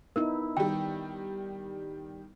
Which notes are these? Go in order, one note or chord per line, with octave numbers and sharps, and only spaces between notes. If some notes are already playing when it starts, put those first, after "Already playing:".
B3 D#4 E4 A#4
D#3 G3 G5